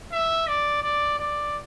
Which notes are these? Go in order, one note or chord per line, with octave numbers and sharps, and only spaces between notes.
E5
D5
D5
D5